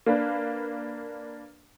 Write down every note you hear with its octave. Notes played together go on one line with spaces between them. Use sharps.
A#3 D4 B4